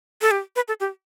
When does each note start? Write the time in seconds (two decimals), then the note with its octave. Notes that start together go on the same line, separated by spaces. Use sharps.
0.22 A4
0.31 G4
0.56 B4
0.68 A4
0.80 G4